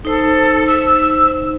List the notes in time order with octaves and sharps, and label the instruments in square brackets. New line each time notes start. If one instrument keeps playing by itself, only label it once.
[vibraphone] D#4 C5 [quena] A4
[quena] E6